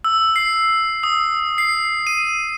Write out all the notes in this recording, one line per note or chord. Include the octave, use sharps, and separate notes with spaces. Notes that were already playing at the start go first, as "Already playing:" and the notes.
E6
C7
D#6
C7
D#7